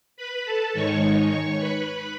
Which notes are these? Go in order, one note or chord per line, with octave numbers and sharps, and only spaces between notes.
B4 B5
A4 A5
G#2 D#3 G#3 D#4 C#5 C#6
B4 B5